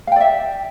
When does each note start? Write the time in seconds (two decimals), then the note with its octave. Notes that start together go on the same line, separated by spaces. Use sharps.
0.07 F5
0.12 G5
0.16 D5
0.20 E5